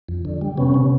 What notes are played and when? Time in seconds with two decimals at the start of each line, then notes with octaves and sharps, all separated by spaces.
0.09 F2
0.25 D3
0.41 G3
0.57 C3 B3 C#4
0.74 C3